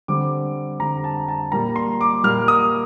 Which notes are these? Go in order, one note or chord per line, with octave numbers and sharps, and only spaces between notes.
D3 G3 C4 D6
D3 G3 C4 A#5
A5
A5
A#2 G3 A#3 A#5
C6
D6
A#2 G3 A#3 F6
D#6